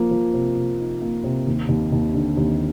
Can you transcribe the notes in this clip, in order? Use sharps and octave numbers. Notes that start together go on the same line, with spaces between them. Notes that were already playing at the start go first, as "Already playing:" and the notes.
Already playing: F3 A#3
F3
C3
C3
D#4
A#3
C3
D#2
D#2
D#2
D3
D#2